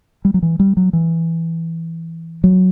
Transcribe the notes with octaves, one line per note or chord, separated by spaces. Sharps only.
G3
F#3
E3
G3
F#3
E3
F#3